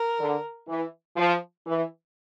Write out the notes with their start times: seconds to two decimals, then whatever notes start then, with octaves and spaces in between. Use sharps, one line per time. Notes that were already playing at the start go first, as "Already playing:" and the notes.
Already playing: A#4
0.19 D3
0.68 E3
1.16 F3
1.66 E3